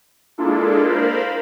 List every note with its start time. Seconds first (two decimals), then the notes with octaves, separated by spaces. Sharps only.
0.38 G#3 A#3 D4 E4 F4 A4
0.84 A#4 C5 F5 B5